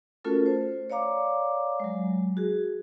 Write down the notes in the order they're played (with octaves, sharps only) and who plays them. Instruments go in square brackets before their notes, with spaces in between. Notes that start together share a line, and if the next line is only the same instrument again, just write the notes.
[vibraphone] A3 C#4 F4 F#4 A4 A#4
C5
C#5 D5 F5 A#5 D6
F#3 G#3
F#4 G#4